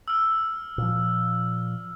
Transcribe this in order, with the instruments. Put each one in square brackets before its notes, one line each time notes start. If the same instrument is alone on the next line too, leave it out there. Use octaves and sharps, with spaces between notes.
[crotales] E6 F6
[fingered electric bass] A#2 F3